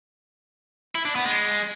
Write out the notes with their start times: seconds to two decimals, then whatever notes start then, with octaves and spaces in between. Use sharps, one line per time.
0.95 E4
1.05 D4
1.16 B3
1.26 G#3